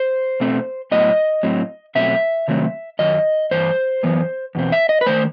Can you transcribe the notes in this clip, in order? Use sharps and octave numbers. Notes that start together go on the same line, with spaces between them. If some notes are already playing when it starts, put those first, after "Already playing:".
Already playing: C5
B2 A3 C4
A2 F#3 B3 D#5
A2 F#3 C4
B2 F#3 A3 C4 E5
C3 D#3 F#3 A3 C4
F#2 D#3 F#3 D#5
G2 E3 C5
F#2 E3 B3
E2 B2 C4
E5
D#5
B4
D#3 A3 C5